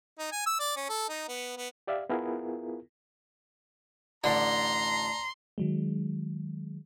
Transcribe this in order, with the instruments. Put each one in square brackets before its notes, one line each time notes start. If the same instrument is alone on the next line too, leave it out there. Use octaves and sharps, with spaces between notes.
[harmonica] D#4
G#5
E6
D5
C#4
A4
D#4
B3
B3
[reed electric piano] G4 D5 E5 F5
B3 E4 F4 G#4 A#4
[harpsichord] A1 D3 [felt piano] D5 A5 [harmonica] A#5 [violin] C6
[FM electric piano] D#3 F#3 G#3